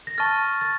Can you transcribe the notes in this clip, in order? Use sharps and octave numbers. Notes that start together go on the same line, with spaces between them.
A#6
A5 C#6 F6 A6
A6